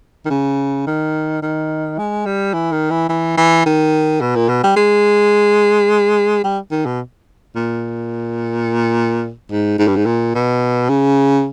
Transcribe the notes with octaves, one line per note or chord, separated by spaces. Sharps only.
D#3
C#3
D#3
D#3
G#3
G3
E3
D#3
E3
E3
E3
D#3
B2
A#2
B2
G3
G#3
G3
D#3
B2
A#2
G#2
G#2
G2
G#2
A#2
B2
C#3